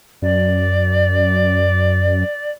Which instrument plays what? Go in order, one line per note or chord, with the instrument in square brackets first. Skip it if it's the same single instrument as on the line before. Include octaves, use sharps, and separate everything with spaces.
[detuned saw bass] F#2 [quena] D5